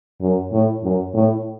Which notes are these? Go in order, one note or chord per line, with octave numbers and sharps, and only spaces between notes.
F#2
A2
F#2
A2